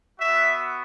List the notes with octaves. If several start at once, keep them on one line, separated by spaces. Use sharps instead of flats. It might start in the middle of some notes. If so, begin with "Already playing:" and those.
B3 F#4 E5